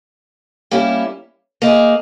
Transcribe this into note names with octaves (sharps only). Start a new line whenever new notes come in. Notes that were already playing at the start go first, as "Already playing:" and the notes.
G3 A#3 C#4 E4 G4
A#3 D#4 G#4